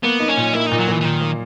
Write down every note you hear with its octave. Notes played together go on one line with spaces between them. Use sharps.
A#3 B3
D#4
C#4
A#2
A#3 E4
A#2 D#4
F#3
A#2 E3
E3
A#2 D#3
A#3